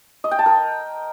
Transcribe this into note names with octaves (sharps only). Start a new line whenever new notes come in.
D#5
G5
A5
A#4